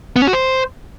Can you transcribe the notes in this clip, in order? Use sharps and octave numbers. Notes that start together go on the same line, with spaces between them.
B3
C#4
F#4
C5